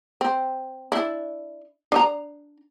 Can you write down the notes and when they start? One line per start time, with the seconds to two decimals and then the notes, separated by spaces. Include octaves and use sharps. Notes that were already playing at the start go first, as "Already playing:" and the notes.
0.21 C4
0.92 D4 E4
1.92 D4 D#5 A#5